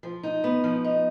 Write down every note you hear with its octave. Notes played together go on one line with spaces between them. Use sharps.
F3
D#4
B3
F3
D#4